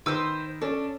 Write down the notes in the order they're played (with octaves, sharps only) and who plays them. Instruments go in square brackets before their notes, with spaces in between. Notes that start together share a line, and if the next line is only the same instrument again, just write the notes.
[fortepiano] D#3 E6 [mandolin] B4 C5
[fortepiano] C#4 A4 [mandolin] D4